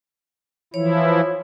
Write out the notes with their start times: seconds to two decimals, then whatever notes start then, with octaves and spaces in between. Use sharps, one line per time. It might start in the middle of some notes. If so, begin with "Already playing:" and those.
0.74 E3 F3 E4 C#5